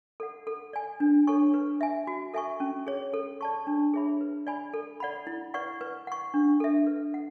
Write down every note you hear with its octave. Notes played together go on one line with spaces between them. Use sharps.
A4 D5 F#5
A4
D5 G#5
D4
A4 C#5 G#5 C#6
B4
E5 G#5
F#4
A4 E5 G#5 C#6
C#4
G#4 C#5
A4
D5 A5 C#6
D4
G#4 C#5 E5 B5
B4
D5 G#5 B5
A4
D5 F#5 B5
E4
B4 D5 F#5 C#6
B4
F#5 C#6
D4
A4 E5
B4
F#5